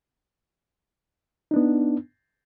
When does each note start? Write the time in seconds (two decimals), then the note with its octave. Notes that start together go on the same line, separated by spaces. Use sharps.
1.51 D#4
1.54 D4
1.56 B3